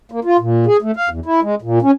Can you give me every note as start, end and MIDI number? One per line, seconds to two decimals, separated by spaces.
0.12 0.20 58
0.25 0.37 65
0.39 0.66 46
0.66 0.77 68
0.82 0.91 57
0.96 1.09 77
1.09 1.20 40
1.26 1.40 64
1.42 1.55 56
1.62 1.79 46
1.82 1.91 61